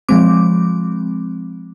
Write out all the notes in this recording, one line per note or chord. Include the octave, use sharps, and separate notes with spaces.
F3 G#3 C4 D6